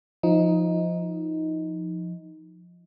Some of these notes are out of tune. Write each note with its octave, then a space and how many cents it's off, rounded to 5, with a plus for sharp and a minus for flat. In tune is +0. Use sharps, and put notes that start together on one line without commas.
F3 +0 D#4 +15